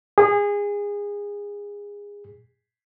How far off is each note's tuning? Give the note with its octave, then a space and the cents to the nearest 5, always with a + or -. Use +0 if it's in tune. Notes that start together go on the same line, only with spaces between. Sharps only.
G#4 -25